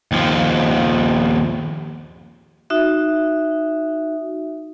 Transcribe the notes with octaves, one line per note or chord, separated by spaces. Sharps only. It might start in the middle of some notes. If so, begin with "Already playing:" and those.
D#2 F3
D#4 F#4 E5